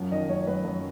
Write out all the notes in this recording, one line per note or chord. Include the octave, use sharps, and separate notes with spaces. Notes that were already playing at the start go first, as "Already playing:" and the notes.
Already playing: F#2 F3 F#5
D#3 D#5
F#2 C#5
C#5
F#3 B4
F#2